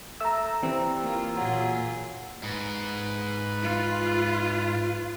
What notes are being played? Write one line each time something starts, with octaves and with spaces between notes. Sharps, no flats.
A3 A#5 E6
E3 G3 C4
A#3 F4
A#2 F#3 F4 G#4
G#2 B4
F4